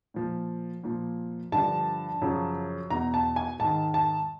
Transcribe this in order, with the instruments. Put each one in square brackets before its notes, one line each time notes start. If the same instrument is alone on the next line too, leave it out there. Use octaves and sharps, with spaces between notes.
[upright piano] A#2 F3
A#2 F3
G2 D3 F3 A5
F#2 C#3 F3
E2 B2 A#5
A5
G#5
G#2 D#3 A5
A5